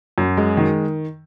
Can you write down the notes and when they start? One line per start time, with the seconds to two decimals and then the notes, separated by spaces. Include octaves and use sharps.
0.18 F#2
0.37 G#3
0.57 D#3